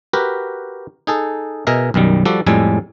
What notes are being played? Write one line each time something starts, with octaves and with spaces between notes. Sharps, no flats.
F#4 G4 A#4 B4
D#4 G#4 A4
B2 G#4 A#4 D#5 E5
B1 F#2 D#3 G3
F3 G3 F#4 A4 D5
F2 A2 G3 G#3 A4 G#5